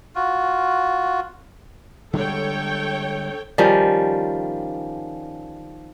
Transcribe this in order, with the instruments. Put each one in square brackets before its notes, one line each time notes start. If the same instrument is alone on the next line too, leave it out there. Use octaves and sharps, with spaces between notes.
[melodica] F4 F#4
[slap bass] D3 G3 G#3 [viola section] A4 C#5 G5
[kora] D#3 F3 G3 C#4